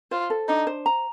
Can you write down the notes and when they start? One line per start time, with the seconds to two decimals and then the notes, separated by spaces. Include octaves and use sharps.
0.11 F4 C5
0.30 A4
0.48 D4 D#4
0.67 C5
0.86 A#5